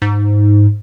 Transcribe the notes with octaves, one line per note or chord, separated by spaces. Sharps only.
G#2